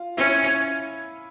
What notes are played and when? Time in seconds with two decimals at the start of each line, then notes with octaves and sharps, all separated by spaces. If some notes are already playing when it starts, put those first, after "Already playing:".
Already playing: F4
0.17 C#4 E4